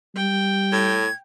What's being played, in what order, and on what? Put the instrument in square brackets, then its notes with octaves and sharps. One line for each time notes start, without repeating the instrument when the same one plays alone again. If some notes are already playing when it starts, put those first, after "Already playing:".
[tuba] G3 [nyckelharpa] G5
[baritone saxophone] A2 [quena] G#6